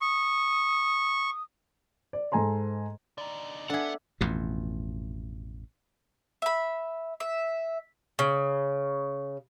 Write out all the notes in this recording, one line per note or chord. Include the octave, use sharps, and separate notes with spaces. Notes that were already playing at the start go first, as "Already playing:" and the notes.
C#6 D#6
D5
G#2 A4 G#5 A#5 C6
D3 D#4 D5
B3 D4 G#4 A4 E5 F#5
A1 F2 B2
E5 B5
E5
C#3